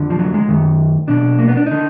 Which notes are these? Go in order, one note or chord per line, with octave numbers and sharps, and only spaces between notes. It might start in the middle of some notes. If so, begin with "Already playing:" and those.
Already playing: F2 D3
F3
F#3
G#3
F#2 D#3
B1 B2 D4
A#3
B3
D4
D3 D#4